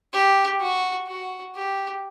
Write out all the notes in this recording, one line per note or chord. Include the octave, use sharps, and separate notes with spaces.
G4
F#4
F#4
G4